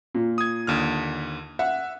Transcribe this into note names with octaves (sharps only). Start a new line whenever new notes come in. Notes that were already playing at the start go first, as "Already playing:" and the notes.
A#2
D#6 G#6
D#2 D3 F6
E5 F#5